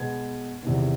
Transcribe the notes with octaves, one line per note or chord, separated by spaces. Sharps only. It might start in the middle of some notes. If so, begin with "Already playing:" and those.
Already playing: B2 G#3 B3 G#6
E2 C3 D#3 G3 B3